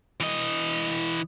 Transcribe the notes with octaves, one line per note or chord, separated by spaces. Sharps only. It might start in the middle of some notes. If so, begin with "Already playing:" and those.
E3 D#5